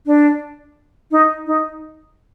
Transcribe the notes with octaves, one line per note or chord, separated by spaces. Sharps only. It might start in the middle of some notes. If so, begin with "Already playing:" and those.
D4
D#4
D#4